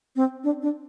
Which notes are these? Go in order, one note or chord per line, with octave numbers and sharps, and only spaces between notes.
C4
D4
D4